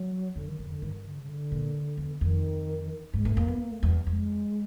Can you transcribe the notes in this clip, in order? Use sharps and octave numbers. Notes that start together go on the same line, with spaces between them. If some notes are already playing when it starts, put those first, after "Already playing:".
Already playing: F#3
F2 D3
D#3
F2 D3
D3
G2 D#3
D3
C#3
D3
A#2
E2
F2 D#3
G2 G#3
G2 A3
F2 A#3
F2 B3
A#3
A3
E2 G3
F2 G#3